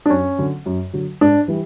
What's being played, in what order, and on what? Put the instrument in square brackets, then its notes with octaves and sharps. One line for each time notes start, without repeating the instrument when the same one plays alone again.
[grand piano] D4
F#2 C#4
D3 F#3
F#2
D3 F#3
G#2 D4
E3 G3